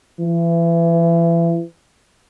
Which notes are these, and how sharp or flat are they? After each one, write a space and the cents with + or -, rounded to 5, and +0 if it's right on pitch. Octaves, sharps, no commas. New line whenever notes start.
E3 +30